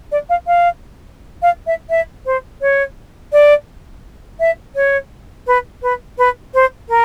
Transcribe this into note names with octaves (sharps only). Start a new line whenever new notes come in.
D5
F5
F5
F5
E5
E5
C5
C#5
D5
E5
C#5
B4
B4
B4
C5
A#4